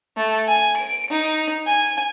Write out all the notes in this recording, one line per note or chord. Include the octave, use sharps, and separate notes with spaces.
A3
G#5
D7
D#4
G#5